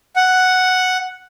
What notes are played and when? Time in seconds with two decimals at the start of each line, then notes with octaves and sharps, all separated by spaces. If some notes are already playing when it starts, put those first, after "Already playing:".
0.16 F#5